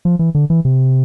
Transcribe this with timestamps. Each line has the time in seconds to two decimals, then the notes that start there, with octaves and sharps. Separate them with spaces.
0.05 F3
0.19 E3
0.35 D3
0.50 E3
0.65 C3